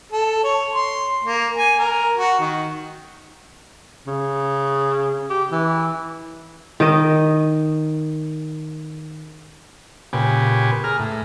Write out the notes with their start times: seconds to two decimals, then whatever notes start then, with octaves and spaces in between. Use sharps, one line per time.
0.12 A4
0.44 C#5
0.73 C6
1.24 A#3
1.55 G#5
1.79 A#4
2.17 F#4
2.40 D#3
4.07 C#3
5.30 G4
5.52 E3
6.80 D#3 D#5
10.13 A#2 C#3 G4 B4 G#5
10.84 G#4 A#5 F6
10.99 A2